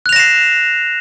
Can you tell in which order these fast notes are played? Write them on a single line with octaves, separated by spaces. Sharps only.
F#6 F7 A#6 E7 C7